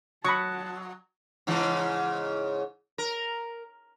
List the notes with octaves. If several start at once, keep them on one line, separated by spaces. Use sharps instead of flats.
F#3 A5 B5 C#6 D#6 A#6 C#7
G#2 C#3 E3
A#4